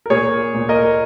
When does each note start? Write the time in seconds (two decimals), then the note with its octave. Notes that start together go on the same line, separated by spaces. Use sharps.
0.06 A#4
0.10 A#2 G#4 C#5
0.25 A#3
0.39 A#3
0.54 A#2
0.69 A#2 A#4 D#5
0.84 A#3